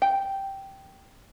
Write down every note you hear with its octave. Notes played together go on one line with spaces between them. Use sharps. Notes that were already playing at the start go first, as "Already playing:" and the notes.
G5